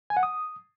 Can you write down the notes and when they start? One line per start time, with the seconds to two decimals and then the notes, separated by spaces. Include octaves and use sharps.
0.10 G#5
0.17 F#5
0.23 D#6